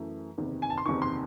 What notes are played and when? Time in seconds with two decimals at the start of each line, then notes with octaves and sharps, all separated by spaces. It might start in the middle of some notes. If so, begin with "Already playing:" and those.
Already playing: F#2 E3 A3
0.38 F#1 E2 C3 D#3
0.62 G#5
0.70 A5
0.78 C6
0.86 F#1 E2 C3 D#3 C#6
1.02 C6